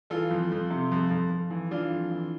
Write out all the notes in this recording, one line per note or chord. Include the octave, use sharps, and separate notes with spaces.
E3 F4 A4
F2
F2
C3
F2
F2
F2
E3
E3 D4 F4
F2
E3